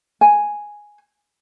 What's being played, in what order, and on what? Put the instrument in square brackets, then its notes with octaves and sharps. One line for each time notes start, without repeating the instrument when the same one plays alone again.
[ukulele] G#5